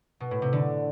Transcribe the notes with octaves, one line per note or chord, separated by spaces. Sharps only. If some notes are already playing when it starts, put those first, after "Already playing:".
B2
A2
C3
D3